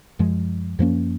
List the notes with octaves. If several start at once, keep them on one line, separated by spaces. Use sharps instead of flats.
F#2 F3 G#3
F#2 F3 A#3 C#4